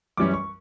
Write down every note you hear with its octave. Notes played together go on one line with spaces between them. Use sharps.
F#2 E3 G3 C#4 D6
C#6